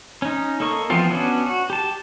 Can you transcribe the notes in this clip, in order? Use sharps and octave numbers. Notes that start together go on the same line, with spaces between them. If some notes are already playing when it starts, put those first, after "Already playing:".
C#4 D#4
A#3 A4 D#5 C#6
E3 F3 B3 C4 F4
B3 C#4 D4 F#4
F#4
G4 A5